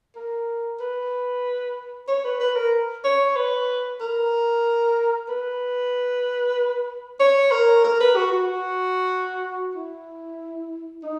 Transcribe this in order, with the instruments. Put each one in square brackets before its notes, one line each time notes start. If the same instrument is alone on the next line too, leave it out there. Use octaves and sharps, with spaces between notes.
[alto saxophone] A#4
B4
C#5
B4
B4
A#4
C#5
B4
A#4
B4
C#5
A#4
A#4
B4
F#4
F#4
E4
D#4